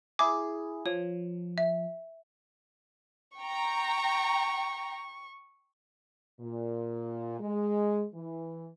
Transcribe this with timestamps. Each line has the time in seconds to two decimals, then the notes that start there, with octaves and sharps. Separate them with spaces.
0.19 E4 G#4 D6
0.86 F3 C#5
1.58 E5
3.37 G5 A#5 C#6
6.40 A#2
7.40 G#3
8.14 E3